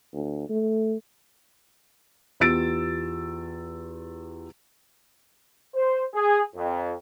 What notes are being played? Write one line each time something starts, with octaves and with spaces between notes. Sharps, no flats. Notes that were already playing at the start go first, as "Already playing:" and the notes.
D2
A3
E2 F4 G4 E6 A6 D7
C5
G#4
F2